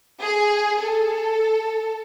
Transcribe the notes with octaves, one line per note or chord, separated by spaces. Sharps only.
G#4
A4